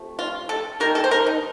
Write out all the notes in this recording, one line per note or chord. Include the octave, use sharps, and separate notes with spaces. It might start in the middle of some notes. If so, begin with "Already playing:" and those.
Already playing: C3 F3 A3
F4
A4
D#3 G3 A#3 A#4
A4
C5
A#4
D#4